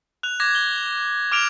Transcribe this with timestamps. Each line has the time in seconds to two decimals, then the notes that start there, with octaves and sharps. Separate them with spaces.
0.23 F#6 F7
0.40 D6 G#6 A#6
0.55 G7
1.32 D6 F6 D7 F7